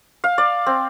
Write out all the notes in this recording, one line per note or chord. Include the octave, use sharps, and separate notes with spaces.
F5
D5
C4